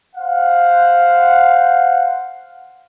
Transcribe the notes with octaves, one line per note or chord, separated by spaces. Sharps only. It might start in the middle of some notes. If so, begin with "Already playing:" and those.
C5 F5 F#5